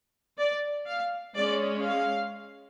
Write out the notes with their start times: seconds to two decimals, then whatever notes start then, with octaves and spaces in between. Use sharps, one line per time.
0.37 D5
0.86 F5
1.35 G#3 C#4 D5
1.85 F5